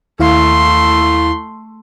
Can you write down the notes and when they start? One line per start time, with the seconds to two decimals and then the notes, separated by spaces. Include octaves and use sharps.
0.20 D#2 A3 E4 F5 C6